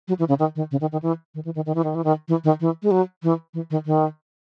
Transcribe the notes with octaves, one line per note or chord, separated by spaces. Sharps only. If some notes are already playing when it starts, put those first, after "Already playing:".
F#3
E3
C#3
D#3
D#3
C#3
D#3
D#3
E3
D#3
E3
D#3
D#3
E3
D#3
E3
D#3
E3
D#3
E3
G#3
F#3
E3
E3
D#3
D#3